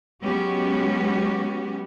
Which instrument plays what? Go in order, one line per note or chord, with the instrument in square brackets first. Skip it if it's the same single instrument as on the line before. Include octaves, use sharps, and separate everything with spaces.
[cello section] F#3 G#3 B3 C#4 F#4 G4